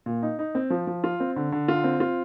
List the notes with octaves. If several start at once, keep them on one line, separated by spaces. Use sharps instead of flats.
A#2
D#4
D#4
C4
F3
F3
F4
C4
D3
D3
F4
C4
F4